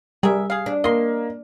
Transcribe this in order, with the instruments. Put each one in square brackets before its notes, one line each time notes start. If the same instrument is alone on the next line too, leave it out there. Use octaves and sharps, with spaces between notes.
[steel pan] G3 [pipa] G#4 A#4 E5
[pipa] G#4 F5
[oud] D4
[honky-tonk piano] A#3 [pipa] D#5 C6